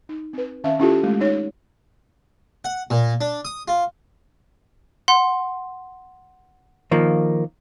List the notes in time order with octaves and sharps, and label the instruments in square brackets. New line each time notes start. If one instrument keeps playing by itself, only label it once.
[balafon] D#4
C4 B4
D#3 C#4 E5 F5
C#4 E4 F4 G4 A4
G#3 A3
D#4 C#5
[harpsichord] F#5
A#2
D4
D#6
F4
[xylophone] F#5 C6
[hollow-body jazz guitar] D#3 F3 A#3